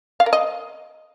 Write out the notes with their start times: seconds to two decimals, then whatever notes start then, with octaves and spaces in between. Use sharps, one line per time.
0.20 F5
0.26 A#4
0.33 D#5